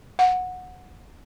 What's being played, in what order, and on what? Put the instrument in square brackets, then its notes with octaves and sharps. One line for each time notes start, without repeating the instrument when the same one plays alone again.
[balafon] F#5